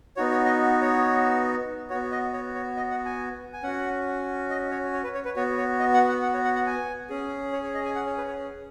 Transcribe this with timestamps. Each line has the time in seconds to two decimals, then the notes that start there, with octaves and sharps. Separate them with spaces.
0.17 B3 D#4 F#4 C#5
0.31 C#5
0.46 D#5
0.82 C#5
1.90 B3 F#4 C#5
2.12 D#5
2.33 C#5
2.55 C#5
2.77 D#5
2.91 F#5
3.05 G#5
3.53 G#5
3.63 C#4 F#4 F#5
4.50 D#5
4.71 C#5
4.93 C#5
5.04 B4
5.15 C#5
5.25 B4
5.36 B3 F#4 C#5
5.58 C#5
5.80 D#5
5.94 F#5
6.08 F#5
6.23 F#5
6.34 C#5
6.45 F#5
6.55 F#5
6.66 G#5
7.09 C#4 G#4
7.53 C#5
7.64 C#5
7.74 D#5
7.85 G#5
7.95 F#5
8.06 C#5
8.18 B4
8.28 C#5